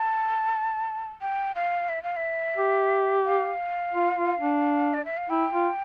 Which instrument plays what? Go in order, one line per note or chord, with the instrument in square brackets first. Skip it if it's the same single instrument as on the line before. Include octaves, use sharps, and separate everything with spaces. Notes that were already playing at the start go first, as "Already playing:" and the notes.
Already playing: [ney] A5
G5
F5
E5
F5
E5
[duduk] G4
[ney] F5
[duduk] F4
F4
D4
[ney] D5
E5
F5
[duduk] E4 [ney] G5
[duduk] F4